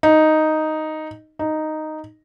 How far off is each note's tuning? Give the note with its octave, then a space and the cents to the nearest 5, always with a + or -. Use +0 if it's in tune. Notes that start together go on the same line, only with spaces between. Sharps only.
D#4 +0
D#4 -5